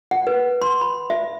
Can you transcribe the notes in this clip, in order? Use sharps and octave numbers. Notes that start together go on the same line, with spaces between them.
F#5
B4
C6
B5
E5